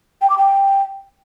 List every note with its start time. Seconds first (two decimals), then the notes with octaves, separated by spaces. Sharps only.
0.22 G5
0.30 D6
0.38 G5